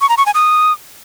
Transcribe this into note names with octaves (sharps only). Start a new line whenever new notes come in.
C#6
A#5
C#6
G#5
D#6